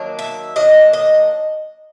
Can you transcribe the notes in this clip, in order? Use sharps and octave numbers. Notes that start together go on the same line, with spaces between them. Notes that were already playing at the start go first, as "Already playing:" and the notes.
Already playing: D#3 F#3 A#3 D4
E5
D#3 F#3 A#3 D4 D#5
D#5